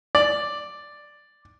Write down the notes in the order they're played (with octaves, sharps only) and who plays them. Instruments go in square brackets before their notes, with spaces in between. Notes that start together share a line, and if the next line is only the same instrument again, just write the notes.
[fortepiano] D5